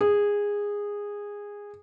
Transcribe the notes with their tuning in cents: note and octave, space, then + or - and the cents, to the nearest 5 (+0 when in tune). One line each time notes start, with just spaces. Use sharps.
G#4 -15